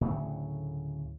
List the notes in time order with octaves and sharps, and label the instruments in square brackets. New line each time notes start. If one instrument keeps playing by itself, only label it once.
[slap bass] D2 A2 C#3 F#3